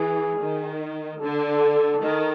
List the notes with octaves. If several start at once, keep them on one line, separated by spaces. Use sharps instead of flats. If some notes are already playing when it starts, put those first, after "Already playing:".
Already playing: E3 G#4
D#3
D3 A4
D#3